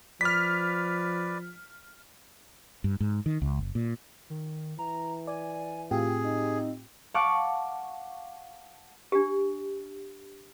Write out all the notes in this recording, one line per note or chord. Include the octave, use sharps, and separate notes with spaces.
F3 B4 D5 F6 B6
G2
G#2
D#3
C#2
F#1
A#2
D#3
E3 A#5
D5 G#5
A2 C4 F4 G4 G#4
D#4
F5 F#5 A5 C#6 D6 F#6
D4 G4